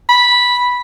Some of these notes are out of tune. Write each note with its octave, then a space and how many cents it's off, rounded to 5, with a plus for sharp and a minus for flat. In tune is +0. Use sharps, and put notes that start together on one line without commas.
B5 -5